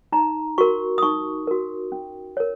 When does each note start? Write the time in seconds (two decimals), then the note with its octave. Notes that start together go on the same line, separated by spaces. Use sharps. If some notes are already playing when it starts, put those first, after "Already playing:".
0.12 D#4 A#5
0.58 F#4 A#4 C#6
0.98 D#6
1.03 D#4 C#6
1.47 F#4 A#4
1.92 C#4
2.37 A#4 C#5